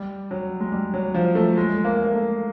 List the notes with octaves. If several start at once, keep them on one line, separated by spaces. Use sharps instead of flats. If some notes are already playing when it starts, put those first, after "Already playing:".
Already playing: G3
F#3
G#3
G3
F#3
F3
A3
G#3
A#3
A#3
A3